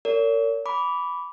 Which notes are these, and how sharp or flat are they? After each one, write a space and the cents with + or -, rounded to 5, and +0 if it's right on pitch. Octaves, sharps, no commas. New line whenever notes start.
A#4 -35 C#5 +40
B5 +0 D6 -20